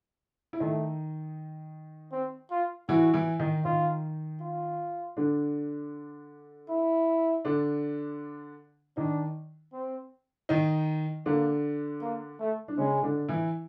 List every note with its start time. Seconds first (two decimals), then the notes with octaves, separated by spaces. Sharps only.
0.53 E4
0.60 D#3 A3 D#4
2.12 C4
2.51 F4
2.89 E3 E4 F#4
3.14 E3 E4
3.39 D#3 D#4
3.65 D#3 D#4 F4
4.41 F4
5.17 D3 D4
6.69 E4
7.45 D3 D4
8.97 D#3 D4 D#4
9.73 C4
10.49 D#3 D#4
11.26 D3 A#3 D4
12.02 A#3
12.40 A3
12.68 D4
12.78 C#3 G#3 C#4
13.03 D3 D4
13.29 E3 E4